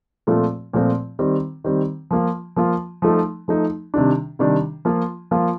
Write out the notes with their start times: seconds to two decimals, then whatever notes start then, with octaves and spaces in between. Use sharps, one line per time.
0.27 A#2 F3 A3 C4 F4
0.73 A#2 F3 A3 C4 F4
1.19 D#3 G3 C4
1.64 D#3 G3 C4
2.11 F3 A#3 F4
2.56 F3 A#3 F4
3.02 F3 A3 D#4
3.48 F3 A3 D#4
3.94 C3 D#3 G3 D4
4.39 C3 D#3 G3 D4
4.85 F3 A#3 F4
5.31 F3 A#3 F4